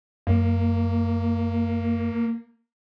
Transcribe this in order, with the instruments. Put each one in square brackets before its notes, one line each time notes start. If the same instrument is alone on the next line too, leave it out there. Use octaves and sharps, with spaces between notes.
[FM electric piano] F#2 [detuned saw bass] A#3